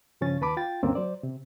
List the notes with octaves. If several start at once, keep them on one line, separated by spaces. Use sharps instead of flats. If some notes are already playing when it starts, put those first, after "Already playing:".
G2 C#3 F3 C#4 A6
D#2 B4 A5 B5 D6
F4 G5 A6
D2 G2 D3 A#3 C4 C#4
F#3 C5 D5
C3